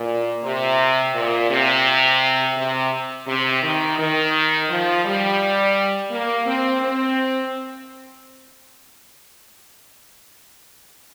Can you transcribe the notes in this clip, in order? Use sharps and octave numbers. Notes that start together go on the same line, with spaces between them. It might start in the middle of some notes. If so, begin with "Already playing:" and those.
Already playing: A#2
C3
A#2
C3
C3
C3
D#3
D#3
F3
G3
A#3
C4
C4